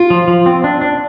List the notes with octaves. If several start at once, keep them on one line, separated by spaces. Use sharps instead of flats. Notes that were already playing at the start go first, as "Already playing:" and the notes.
Already playing: F4
F3
F3
C4
D4
D4